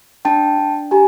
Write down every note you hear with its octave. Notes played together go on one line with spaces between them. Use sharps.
D4 G5 A5
D4
G4 G#5 A#5